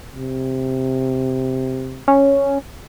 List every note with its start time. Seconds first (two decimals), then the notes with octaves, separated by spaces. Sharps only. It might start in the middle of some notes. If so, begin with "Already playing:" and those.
0.16 C3
2.08 C#4